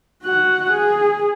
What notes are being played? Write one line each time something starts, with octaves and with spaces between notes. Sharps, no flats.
F#4 F#5
G#4